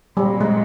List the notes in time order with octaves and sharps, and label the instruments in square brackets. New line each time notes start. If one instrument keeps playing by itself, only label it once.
[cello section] A#2 F#3 A#3 [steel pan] G3
[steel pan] G#3